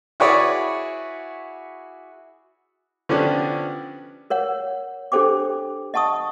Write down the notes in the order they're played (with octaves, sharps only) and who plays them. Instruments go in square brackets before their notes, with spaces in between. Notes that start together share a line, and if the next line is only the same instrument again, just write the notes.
[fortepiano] E4 F#4 G#4 B4 C#5 D5
D3 F3 B3 C#4 D4 G4
[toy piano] A#4 C#5 F#5
D4 G4 A4 C5 G5 D6
D#5 F#5 A5 C#6 D#6